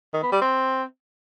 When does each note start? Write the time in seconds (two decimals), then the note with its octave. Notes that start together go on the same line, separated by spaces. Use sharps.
0.14 D#3
0.23 B3
0.32 G3
0.41 C4